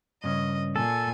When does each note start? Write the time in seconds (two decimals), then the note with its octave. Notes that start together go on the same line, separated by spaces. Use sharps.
0.24 G2 C#3 C#4 D#5
0.76 A#2 A4 G#5